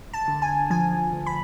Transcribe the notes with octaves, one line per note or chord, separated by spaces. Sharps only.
A5
D3
G#5
F3 G#5
D2
B5